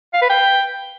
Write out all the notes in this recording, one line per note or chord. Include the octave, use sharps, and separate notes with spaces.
F5
B4
G5